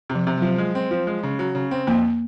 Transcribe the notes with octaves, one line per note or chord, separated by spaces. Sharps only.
C3
F3
C3
F#3
F3
G#3
C4
F3
G#3
C#3
F#3
C#3
C4
F2 A#3